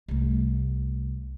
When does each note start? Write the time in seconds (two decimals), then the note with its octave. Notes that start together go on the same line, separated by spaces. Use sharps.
0.08 C2 A3